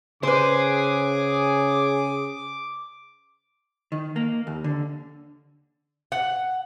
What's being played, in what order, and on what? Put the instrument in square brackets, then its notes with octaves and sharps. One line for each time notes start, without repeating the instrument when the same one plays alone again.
[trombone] C#3 [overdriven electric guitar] G#4 [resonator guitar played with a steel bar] B4 C5 [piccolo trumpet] D6
[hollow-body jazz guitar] D#3
A#3
D#2
D3
[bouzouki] F#5